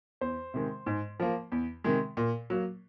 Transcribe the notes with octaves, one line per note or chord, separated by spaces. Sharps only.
E2 C5
C3 D#3 G#3
G#2
F3 A#3
E2
C3 D#3 G#3
A#2
F#3 A#3